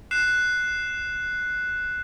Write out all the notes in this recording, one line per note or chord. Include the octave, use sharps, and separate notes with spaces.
F#6 C7 E7